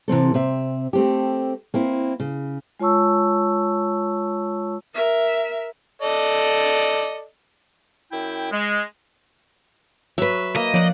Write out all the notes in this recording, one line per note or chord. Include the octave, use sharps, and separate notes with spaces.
C3 E3 C4 A4
C3 C4 E5
A3 C4 G4
A#3 C4 E4
C#3
G#3 F4 C#5 A5 C#6 E6
A#4 E5
A4 D5 D#5
F#2 E4 G5
G#3
F#3 B4 E5
A#3 D#5
F3 C#5 D5 F5 F#5